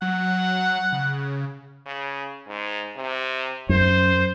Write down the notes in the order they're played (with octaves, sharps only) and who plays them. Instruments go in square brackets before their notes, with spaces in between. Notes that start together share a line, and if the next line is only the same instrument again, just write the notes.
[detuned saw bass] F#3 [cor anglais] F#5
[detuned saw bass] C#3
[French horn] C#3
G#2
C3
[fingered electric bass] F#2 [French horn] C5